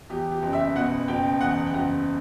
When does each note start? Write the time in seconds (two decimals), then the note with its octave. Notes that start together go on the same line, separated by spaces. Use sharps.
0.09 E2 G4
0.32 G4
0.43 F#1
0.53 E5
0.76 B2 F#5
1.08 F#1 G5
1.41 E2 F#5
1.66 G5
1.74 F#1 F#5